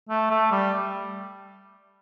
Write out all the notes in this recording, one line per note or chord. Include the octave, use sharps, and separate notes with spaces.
A3
A3
G3